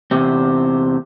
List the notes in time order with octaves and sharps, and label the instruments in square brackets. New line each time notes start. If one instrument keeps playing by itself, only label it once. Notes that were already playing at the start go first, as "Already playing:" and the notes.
[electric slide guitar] E2 C3 C4